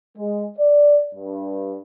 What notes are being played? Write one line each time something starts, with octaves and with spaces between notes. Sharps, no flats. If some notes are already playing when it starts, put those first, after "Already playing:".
G#3
D5
G2